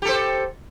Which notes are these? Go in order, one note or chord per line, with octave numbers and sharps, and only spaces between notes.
G4 A4 C5